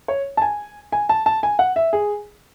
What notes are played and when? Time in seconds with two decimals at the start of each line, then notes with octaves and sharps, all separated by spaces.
0.08 C#5
0.37 A5
0.42 G#5
0.92 G#5
1.09 A5
1.26 A5
1.43 G#5
1.59 F#5
1.76 E5
1.93 G#4